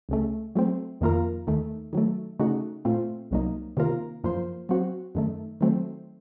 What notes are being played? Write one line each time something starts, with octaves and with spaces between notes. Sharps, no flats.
C#2 C#3 A3
F#3 A3 C4
F2 D#3 A#3 F4 A#4
D#2 D#3 A3
D#3 F#3 A3
C#3 A3 D#4 F#4
A#2 A3 C4 F4
C2 C3 F#3 A#3 D#4
C3 D#3 A#3 F4 A#4
F#2 F3 A#3 F4 C5
F#3 C4 F#4
F#2 D#3 A3
D#3 F#3 A3 C4